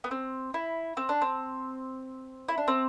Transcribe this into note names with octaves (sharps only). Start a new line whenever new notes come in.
B3
C4
E4
C4
D4
C4
E4
D4
C4